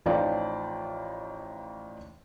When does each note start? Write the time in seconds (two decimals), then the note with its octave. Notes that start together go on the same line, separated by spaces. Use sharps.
0.06 A1 F3 D#4 F4 D5 G5